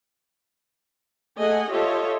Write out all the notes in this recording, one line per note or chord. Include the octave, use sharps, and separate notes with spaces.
A3 G#4 D#5 F#5 G#5
F4 G4 A4 C#5 D#5 E5